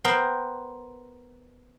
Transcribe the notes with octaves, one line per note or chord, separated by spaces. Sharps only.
B3 A#4 C5 G5